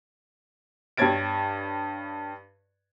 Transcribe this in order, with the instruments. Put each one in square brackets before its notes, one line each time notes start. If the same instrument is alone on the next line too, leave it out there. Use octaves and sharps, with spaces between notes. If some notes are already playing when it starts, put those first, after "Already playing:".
[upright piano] G2 G4 C#5 G#6 A6 D7